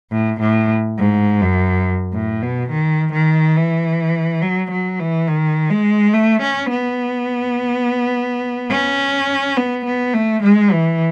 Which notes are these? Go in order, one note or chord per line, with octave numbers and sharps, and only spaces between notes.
A2
A2
G#2
F#2
A2
B2
D#3
D#3
E3
F#3
F#3
E3
D#3
G#3
A3
C#4
B3
C#4
B3
B3
A3
G#3
E3